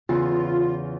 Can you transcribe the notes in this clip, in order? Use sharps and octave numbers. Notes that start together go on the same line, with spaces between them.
E2 C#3 E3 F4